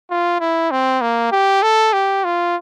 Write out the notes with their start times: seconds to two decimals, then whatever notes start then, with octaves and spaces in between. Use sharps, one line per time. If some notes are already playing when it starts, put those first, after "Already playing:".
0.11 F4
0.40 E4
0.71 C4
1.01 A#3
1.32 G4
1.63 A4
1.93 G4
2.24 F4